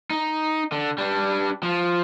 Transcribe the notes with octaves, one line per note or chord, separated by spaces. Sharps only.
D#4
D3
G3 D4
F3